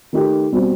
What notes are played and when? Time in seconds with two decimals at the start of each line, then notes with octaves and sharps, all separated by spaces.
0.13 D#3 A3 D#4 G4
0.52 B2 G3 C4 F#4